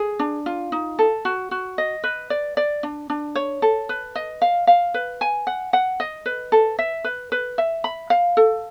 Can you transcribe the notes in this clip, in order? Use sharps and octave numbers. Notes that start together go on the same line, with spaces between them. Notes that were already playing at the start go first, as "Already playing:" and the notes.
Already playing: G#4
D4
F4
D#4
A4
F#4
F#4
D#5
B4
D5
D5
D4
D4
C#5
A4
B4
D#5
F5
F5
B4
G#5
F#5
F#5
D#5
B4
A4
E5
B4
B4
E5
B5
F5
A4